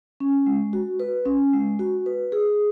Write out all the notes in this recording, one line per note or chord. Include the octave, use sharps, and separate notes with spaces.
C#4
G#3
F#4
B4
C#4
G#3
F#4
B4
G#4